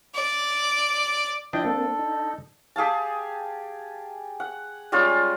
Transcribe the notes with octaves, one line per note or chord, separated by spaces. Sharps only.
D5
F3 D4 E4 D#5 G5
A#3 C4 A4
D#4
G4 G#4 F5 A5
F#5
G3 G#3 C#4 F4